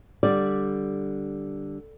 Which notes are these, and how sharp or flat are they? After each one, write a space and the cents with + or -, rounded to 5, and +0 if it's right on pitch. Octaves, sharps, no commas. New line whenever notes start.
D3 +0 G3 +0 D5 +0